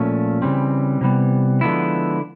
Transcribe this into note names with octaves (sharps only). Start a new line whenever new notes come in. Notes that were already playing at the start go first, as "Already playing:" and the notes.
Already playing: A#2 F3 A3 C#4
C#3 E3 G3 C4
C3 E3 G3 B3
D3 F3 G#3 B3 E4